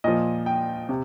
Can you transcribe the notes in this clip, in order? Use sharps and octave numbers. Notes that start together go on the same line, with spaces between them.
A#2 F3 D#5
G5
C3